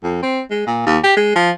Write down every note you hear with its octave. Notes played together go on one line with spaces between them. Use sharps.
F2
C4
G#3
A#2
D#2
G4
G#3
F3